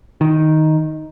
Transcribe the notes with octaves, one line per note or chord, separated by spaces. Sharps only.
D#3